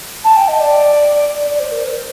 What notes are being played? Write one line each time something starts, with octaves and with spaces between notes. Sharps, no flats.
A5
G5
D#5
D5
D5
D5
C5
A#4
C5